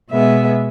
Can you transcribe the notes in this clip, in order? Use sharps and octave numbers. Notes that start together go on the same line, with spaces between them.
B2 G#3 B3 E5